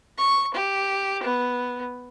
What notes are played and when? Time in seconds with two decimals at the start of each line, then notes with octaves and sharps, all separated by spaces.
0.18 C#6
0.54 G4
1.23 B3